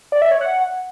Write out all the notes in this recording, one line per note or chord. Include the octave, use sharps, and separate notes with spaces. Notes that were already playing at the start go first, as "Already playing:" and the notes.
D5
E5
C#5
F#5